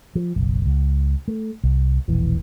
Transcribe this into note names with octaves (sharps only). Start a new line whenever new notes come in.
F3
F#1 B1
C#2
A3
C2
E1 A#1 E3